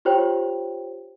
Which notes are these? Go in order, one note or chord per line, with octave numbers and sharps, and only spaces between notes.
F4 G4 C5 C#5 G5